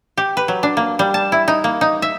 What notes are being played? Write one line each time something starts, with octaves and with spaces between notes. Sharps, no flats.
G4
B4
F#3
D4
A#3
G3
A5
E4
D#4
A#3
D#4
E5